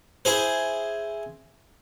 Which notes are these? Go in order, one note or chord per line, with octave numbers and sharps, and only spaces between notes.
E4 G#4 C5